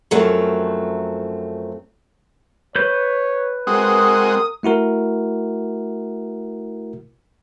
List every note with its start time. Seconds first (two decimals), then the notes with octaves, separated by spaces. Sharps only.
0.11 F#2 F3 F#3 A3 C4
2.76 B4 C#5 G6
3.67 G#3 C4 F#4 A#4 D#6
4.63 A3 E4 F#4 A#4